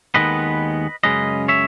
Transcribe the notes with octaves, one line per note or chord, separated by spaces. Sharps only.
D#2 D#3 G#3 B3 B4 D#5
F#2 C#3 G#3 C#4 B4 D#5
C#5 E5